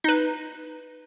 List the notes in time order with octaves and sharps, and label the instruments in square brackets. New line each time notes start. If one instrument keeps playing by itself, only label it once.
[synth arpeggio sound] D#4 B4